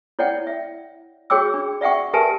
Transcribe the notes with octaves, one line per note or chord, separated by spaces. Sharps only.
E4 C#5 D5 F#5 G5
E5
F#4 G#4 C#5 G5 D6 E6
D4
D5 E5 F#5 G5 C#6
G4 A#4 B4 E5 G#5 A5